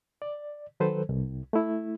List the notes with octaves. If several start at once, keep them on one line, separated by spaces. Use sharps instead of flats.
D5
D#3 F#3 A4 B4 C5
C2
A3 E4